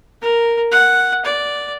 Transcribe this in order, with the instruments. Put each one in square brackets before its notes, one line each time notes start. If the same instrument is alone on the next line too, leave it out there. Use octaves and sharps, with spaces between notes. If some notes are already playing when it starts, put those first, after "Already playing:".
[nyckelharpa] A#4
F#5
D5